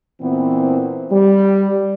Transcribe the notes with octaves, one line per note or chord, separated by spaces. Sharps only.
A#2 E3 B3 C4
G3